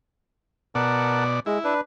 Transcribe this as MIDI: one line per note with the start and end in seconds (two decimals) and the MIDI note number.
0.75 1.40 47
0.75 1.24 70
0.75 1.40 74
0.75 1.24 78
0.75 1.24 81
1.46 1.58 56
1.46 1.74 64
1.64 1.81 62
1.64 1.81 71